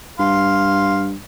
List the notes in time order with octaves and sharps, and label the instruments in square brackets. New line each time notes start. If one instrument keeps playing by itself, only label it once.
[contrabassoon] G2 [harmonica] F5 C6